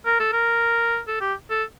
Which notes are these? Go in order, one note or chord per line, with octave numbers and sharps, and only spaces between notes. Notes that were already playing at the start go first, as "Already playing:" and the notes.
A#4
A4
A#4
A4
G4
A4